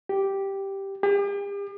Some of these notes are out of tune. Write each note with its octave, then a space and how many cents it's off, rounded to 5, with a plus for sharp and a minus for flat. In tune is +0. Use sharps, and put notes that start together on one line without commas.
G4 -5
G4 +40